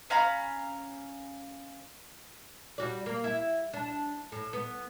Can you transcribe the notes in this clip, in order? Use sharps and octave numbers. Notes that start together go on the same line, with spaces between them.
C#4 F5 A#5 B5
G3 F#4 D5
A#3
E4
D4
A2
B3